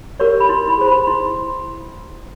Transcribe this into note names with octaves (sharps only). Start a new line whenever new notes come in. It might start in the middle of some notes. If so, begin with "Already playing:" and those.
G4 A#4 C#5 C#6
B5
E4 C6
B5
G#4 C5
B5
E4 C6